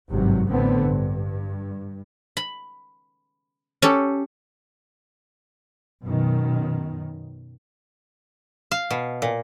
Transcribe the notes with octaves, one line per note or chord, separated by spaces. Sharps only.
G#1 G2 C3 F#3
A1 A2 D3 B3 C4
G2
B5
C#4 G4 A4
F#2 B2 D#3
F5
B2
A#2